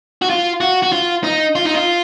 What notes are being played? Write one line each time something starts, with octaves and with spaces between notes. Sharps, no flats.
F#4
F4
F#4
F#4
F4
D#4
F4
D#4
F4